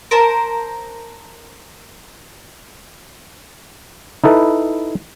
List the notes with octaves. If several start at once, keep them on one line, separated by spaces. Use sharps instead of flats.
A#4 C5 A5
D#4 E4 A4 B4